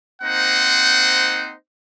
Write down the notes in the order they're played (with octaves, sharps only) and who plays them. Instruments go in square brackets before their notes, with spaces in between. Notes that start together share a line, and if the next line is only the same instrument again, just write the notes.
[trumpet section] A#3 C4 D#4 C5 F#5